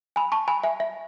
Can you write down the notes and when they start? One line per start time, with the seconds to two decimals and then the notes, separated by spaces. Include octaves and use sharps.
0.16 G#5 B5
0.32 A5 C#6
0.48 G#5 B5
0.64 E5 G#5
0.80 E5